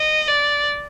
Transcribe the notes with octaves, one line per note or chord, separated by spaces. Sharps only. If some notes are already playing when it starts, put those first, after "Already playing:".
Already playing: D#5
D5